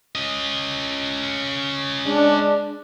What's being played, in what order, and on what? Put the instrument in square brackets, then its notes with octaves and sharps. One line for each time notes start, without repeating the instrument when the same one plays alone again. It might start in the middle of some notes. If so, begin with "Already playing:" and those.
[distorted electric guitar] C#4 D#5
[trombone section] G#3 D4